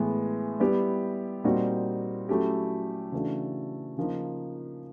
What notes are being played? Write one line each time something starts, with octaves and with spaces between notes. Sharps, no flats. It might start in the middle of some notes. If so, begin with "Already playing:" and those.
Already playing: A2 E3 G#3 B3
G3 B3 E4 G4
A#2 G3 C4 D#4 F#4
F#3 A3 C#4 E4 G4
C#3 E3 A3 D4 F#4
C#3 F3 A#3 D#4